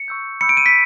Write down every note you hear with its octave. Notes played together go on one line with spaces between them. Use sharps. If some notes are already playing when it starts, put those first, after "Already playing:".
Already playing: C#7
C#6 E6 G6
B5 E6 G6 C#7
D7
D#7
B6